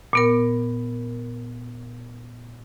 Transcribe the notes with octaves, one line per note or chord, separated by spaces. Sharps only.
A#2 B3 A#4